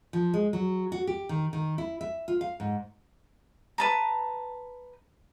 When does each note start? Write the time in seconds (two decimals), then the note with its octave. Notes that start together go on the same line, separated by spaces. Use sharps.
0.13 F3
0.34 G#3
0.53 F#3
0.92 F#4
1.07 G4
1.29 D#3
1.53 D#3
1.78 E4
2.01 E5
2.28 F4
2.41 F5
2.60 G#2
3.78 B4 A5 A#5